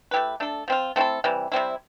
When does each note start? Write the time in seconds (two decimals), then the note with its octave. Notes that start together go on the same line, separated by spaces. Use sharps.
0.11 A3 E4 G4 B4
0.40 A3 D4 A4
0.68 F3 C4 F4
0.96 A3 C4 E4 A4
1.24 C3 E3 G3
1.52 C3 G3 C4 E4